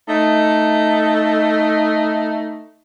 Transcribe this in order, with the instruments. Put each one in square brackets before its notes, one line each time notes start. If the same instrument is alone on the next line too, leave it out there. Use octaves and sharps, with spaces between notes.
[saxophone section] A3 D#4